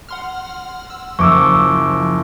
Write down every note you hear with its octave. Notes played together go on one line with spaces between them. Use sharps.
F#5 C6 F6
E6
F#1 F3 C#6 D6 E6